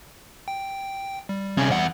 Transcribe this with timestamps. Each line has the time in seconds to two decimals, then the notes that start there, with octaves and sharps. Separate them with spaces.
0.48 G5
1.29 G3
1.58 C3 C#4
1.72 E2 F#5